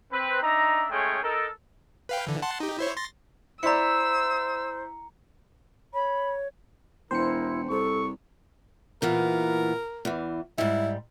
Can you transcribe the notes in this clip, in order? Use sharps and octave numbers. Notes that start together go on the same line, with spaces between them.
C4 B4
D4 D#4 E5 A#5
G#3 A3 C#4 G#4 C#5 G5
D#4 A4 A#4
B4 F5 G5
D3 E3
F#5 A5 C6
D#4 G4
E4 C5 C#5
C6 A6 A#6
E4 C5 D5 A#5 E6 C#7
C#5 B5
E1 E4 A#4 C5 C#7
C2 A4 C#6
A#2 E3 B3 A#4
E2 E3
G#2 G3 E4